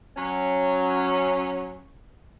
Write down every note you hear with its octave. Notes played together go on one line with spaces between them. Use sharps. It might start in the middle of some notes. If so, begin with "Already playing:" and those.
F#3 C#4